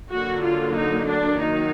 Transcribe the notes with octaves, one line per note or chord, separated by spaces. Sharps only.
D3 F#3 A#3 F#4
F4
D#4
D4
D#3 F#3 A#3 D#4